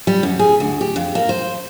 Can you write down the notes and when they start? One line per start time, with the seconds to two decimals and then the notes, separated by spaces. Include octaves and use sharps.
0.07 G3
0.23 F#2
0.39 G#4
0.60 D2
0.81 G4
0.96 F2
1.15 A#3
1.29 C5